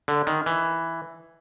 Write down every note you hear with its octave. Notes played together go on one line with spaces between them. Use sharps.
D3
D#3
E3